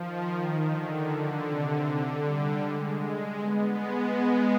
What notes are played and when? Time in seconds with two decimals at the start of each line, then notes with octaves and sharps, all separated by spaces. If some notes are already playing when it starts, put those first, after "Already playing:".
Already playing: D#3 F3
0.69 D3
1.45 C3
1.83 D3
2.22 G3
2.60 G#3
3.36 B3
3.74 G#3